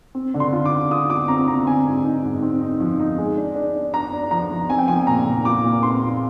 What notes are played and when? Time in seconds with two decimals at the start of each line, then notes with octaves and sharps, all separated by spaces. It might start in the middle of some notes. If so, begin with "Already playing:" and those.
0.15 C4
0.34 D3
0.40 C6
0.53 F4
0.65 D6
0.72 F4
0.91 F4 D#6
1.09 F4 D6
1.28 C4 A#5
1.47 D3 A#5
1.67 C4 G#5
1.86 G#2
2.04 D#4
2.23 G#2
2.42 C4
2.61 D#4
2.80 F3
3.00 D#4
3.18 G#3
3.37 D4
3.55 D4
3.75 D4
3.93 D4 A#5
4.13 D4
4.31 F3 A#5
4.50 F3
4.69 C4 G#5
4.78 G5
4.88 F3 G#5
5.00 G#5
5.07 A#2 A#5
5.26 A#2
5.45 F4 D6
5.64 A#2
5.83 C4 C6
6.02 F4